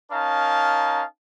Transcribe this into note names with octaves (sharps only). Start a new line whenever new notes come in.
C#4 D#4 A#4 F5 A5